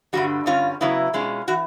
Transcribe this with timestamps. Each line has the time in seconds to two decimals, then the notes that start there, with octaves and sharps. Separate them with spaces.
0.13 G2 D3 G3 F#4
0.46 G2 D3 G3 C#4 F4
0.81 C#3 F#3 B3 E4
1.13 B2 G#3 C#4 F4
1.48 E3 F#4